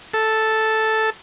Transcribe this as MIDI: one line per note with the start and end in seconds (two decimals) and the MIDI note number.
0.14 1.10 69